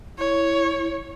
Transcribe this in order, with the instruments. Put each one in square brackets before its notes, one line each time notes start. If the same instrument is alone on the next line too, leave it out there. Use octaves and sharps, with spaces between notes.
[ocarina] E4 [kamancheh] C#5